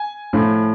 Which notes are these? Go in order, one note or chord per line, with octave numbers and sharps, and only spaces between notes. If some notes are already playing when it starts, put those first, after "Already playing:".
Already playing: G#5
A2 F3